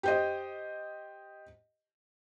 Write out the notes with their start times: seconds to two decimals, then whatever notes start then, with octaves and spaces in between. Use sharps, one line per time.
0.03 G4 C5 D#5